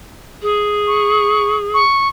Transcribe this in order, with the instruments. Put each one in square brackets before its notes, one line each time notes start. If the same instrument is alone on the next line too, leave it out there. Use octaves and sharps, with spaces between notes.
[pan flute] G#4
[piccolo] C#6
C#6